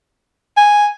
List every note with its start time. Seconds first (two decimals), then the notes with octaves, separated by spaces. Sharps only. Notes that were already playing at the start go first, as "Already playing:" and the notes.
0.57 G#5